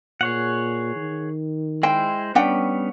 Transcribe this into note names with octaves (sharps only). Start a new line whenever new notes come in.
A#2 G#4 C#5 F#5
D#3
G#3 E4 C5 G5
G3 B3 C#4 D4 F#5 G5